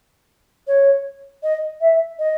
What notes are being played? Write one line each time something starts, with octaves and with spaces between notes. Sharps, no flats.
C#5
D#5
E5
D#5